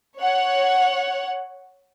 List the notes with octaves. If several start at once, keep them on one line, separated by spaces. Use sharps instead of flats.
C#5 F#5